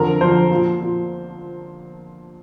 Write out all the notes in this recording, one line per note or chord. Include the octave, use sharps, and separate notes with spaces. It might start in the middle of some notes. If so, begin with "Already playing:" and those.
Already playing: F2 D3 A#4
F2 D3 F3 C5
A#2 F3
A#2 F3